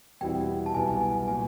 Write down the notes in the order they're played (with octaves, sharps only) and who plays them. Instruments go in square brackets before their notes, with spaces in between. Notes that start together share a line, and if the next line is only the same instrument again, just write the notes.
[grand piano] E2 B2 G3 C4 E4 [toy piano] G5
[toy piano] A5
[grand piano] C2 B2 F#3 B3 E4 [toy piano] G#5
[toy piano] G#5
G#5
[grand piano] A#2 F#3 [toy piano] G#5